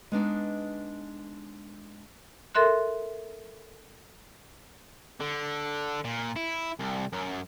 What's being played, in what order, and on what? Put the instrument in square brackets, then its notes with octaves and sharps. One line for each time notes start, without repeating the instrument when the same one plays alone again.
[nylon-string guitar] G#3 B3 D4 D#4
[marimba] A4 A#4 E5 C6 F#6
[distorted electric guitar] D3
A#2
E4
C2
F#2